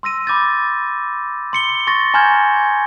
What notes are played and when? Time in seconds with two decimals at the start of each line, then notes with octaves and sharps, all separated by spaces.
0.03 C6 E6 A#6 D#7
0.27 B5 D6 G6 A6
1.53 C6 C#7 G7
1.87 C6 C#6 A6 A#6
2.14 G#5 A#5 C6 F6 G6 G#6